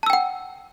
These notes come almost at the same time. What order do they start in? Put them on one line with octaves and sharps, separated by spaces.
A5 E6 G5 F#5